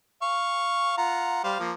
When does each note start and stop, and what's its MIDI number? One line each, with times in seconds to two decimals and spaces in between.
0.22 0.96 77
0.22 0.96 85
0.98 1.40 65
0.98 1.40 78
0.98 1.40 82
1.44 1.60 55
1.44 1.60 72
1.44 1.60 77
1.60 1.73 53
1.60 1.73 58